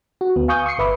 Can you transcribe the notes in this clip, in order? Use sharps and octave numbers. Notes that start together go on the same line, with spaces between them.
F#4
D2 B3
F5 G#5 C#6 D#6 G6
C#6 D#6 C7 C#7
G1 B4 E5 B5 D6